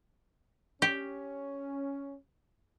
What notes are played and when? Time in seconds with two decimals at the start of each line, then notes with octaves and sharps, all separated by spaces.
0.82 C#4 G4